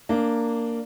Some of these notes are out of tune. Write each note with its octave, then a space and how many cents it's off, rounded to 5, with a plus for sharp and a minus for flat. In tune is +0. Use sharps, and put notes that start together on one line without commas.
A#3 -10 D4 +0